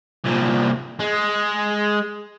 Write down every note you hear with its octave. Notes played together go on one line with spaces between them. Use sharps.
C2 A#2
G#3